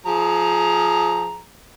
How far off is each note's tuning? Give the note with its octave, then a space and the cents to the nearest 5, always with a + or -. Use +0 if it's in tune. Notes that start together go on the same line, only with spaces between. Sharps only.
F3 +0 G#4 +20 A#5 +0